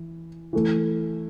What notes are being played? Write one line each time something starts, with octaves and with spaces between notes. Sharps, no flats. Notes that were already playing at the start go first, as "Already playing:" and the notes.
Already playing: E3
E3 A3